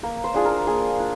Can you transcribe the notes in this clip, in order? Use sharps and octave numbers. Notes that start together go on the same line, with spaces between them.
A#3 A#4
C5
D4 F4 G#4
A#4
A#3 G#4
D4 F4